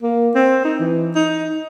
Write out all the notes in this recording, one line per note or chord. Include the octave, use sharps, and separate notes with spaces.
A#3
C4
D#4
E3
D#4